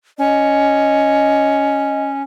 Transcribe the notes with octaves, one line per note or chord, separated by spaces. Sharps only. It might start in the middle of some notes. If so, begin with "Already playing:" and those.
C#4 D#5